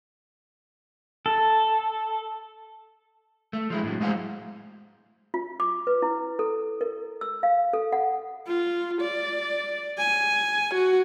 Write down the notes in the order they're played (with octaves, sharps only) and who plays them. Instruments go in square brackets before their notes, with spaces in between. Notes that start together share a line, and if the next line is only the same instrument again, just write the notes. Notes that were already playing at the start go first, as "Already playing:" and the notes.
[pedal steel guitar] A4
[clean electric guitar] A3
F3 G#3 E4
A2 F#3
G#3 A3 G#4 C5 F5 F#5
[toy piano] F4
D6
B4
E4
A4
A#4
E6
F5
A4
F#5
[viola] F4
D5
G#5
F#4